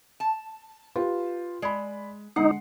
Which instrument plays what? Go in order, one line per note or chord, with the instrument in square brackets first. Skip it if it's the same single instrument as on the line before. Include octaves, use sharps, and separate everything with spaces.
[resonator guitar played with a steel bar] A5
[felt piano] F4 G4 B4
[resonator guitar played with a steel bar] G#3 [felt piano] D5 B5
[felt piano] D3 G#3 C7 [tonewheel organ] D#4 [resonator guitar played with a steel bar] F#5